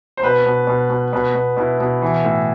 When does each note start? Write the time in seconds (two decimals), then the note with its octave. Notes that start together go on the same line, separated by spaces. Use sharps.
0.17 C5
0.22 B2 B4
0.46 B2
0.67 B2
0.90 B2
1.13 B2 B4
1.34 B2
1.57 B2 E4
1.80 B2
2.02 E3
2.24 A2